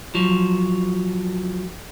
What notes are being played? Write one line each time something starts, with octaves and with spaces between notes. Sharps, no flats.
F3 F#3